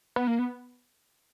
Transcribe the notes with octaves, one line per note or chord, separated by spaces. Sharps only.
B3
A#3
B3